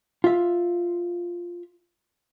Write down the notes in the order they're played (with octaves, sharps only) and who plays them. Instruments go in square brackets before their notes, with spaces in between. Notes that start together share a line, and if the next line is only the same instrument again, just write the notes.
[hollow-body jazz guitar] F4 E5